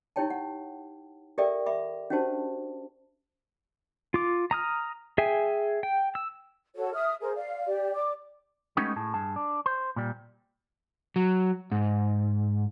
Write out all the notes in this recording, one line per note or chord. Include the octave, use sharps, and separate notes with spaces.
D#4 E4 G4 C#5 G5 A5
F#5
G4 A4 A#4 D5 E5 G5
E5 B5 D6
C#4 D4 F#4 G4 C5 A5
F4 D6
A#5 D#6 F6
G#4 E5 G5 G#5
G5
E6
F#4 A4 C#5
E5 D#6 F6
G#4 A#4 C5
D5 F5
G4 D5
D5 D6
G#3 A3 B3 C#4 D#4 G4
A2 G#4 A5
G2 G#4 A5
D4
C5
A#2 G3
F#3
G#2